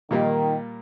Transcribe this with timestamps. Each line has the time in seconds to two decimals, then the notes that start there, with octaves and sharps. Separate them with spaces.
0.11 A#2 D#3 G3 A#3